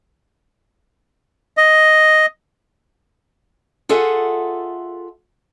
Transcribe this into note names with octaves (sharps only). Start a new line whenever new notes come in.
D#5
F4 G#4 A4 E5 F#5